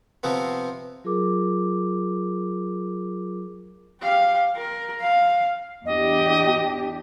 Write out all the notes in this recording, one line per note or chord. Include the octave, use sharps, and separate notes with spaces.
C3 F3 B3 C4
F#3 F4 G#4 A#4 D6
G4 F5
A#4
F5
E2 D4 G4 D#5